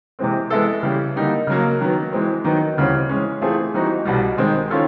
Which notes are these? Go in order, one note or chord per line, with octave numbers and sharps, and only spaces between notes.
C3 E3 G#3 C4
E3 G#3 B3 E4 A4
C#3 E3 G3
D3 G3 A#3 D#4 G4
C#3 F#3 A#3
D#3 F#3 B3
E3 G#3 C4
D#3 F#3 B3 D#4
D2 C#3 E3 G3 C4
E3 G#3 C#4
E3 A3 C4 F4 G#4
E3 G3 C4 D#4 F#4
C2 B2 G3
D#3 G#3 C4
D#3 C#4 F4 A4